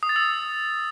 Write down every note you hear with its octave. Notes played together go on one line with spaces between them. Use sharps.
D#6
A6
E6